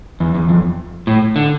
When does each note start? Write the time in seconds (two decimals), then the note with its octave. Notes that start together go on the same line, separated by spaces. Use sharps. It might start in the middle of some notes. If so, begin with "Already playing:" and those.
0.20 E2
0.35 E2
0.49 F2
1.07 A2
1.36 D3